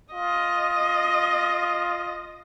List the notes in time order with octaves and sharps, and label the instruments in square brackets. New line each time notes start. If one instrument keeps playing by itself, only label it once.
[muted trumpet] F4 [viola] D#5